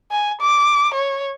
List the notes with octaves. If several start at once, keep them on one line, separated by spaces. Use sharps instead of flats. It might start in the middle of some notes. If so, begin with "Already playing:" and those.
G#5
D6
C#5